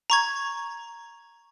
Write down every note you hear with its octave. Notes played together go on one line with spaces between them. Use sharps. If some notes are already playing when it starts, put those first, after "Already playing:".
A#5 C#6 G#6